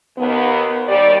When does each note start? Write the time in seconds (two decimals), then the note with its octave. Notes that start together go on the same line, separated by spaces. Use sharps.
0.17 D#2 B3
0.89 D#2 G3 D5